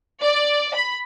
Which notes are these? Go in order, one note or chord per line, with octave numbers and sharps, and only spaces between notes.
D5
B5